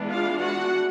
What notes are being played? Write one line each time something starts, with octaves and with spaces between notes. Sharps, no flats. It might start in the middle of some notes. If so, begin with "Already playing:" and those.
Already playing: E3 G#3 B3 D4
F4 F5
F#4 F#5